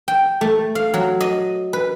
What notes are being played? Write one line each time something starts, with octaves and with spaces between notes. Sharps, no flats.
G5
A3
F5
F#3
D#5
B4